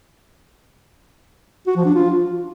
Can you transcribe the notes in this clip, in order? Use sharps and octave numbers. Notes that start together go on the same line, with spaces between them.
F#4
F3
D4
F4